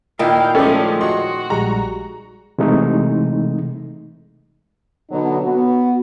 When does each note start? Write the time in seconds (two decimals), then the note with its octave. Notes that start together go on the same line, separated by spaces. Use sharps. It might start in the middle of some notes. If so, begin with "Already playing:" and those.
0.19 A#2 D#3 E4 D#5 F5 G5
0.55 F3 G#3 A3 C#4 A4 D5
1.01 F#4 D#5 C6
1.50 A#1 G3 G#3 A#5
2.58 C3 E3 G#3 A3 D#4
5.10 B2 D3 F#3 B3 D#4
5.42 B3 F#4